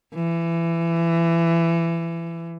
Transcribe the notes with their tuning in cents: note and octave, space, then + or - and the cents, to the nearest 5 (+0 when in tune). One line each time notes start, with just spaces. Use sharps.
E3 +25